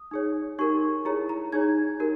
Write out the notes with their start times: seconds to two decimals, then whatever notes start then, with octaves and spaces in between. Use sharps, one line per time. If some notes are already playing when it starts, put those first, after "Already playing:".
Already playing: D#6
0.11 D#4 G#4 C#5
0.59 D#4 G4 A#4 C#6
1.05 E4 G#4 C#5 A#5
1.29 A#5
1.52 D#4 G#4 C#5 G#6
2.00 D#4 G4 A#4